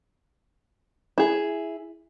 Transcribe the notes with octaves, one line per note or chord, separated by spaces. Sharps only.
E4 G#4